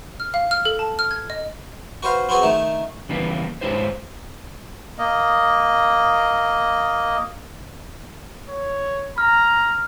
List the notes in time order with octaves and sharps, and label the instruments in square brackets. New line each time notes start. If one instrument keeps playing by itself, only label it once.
[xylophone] F6
F5
F6
A4
A5
F6
G#6
D#5
[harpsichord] F#4 B4 C5 F5
B3 C4 F#4 G#4
D#3 A3 D#4
[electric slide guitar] C#3 E3 G3 A#3 B3
G#2 G#3 E4 G4 C5 C#5
[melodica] A#3 D#5
[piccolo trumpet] C#5
[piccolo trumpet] A#5 [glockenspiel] F6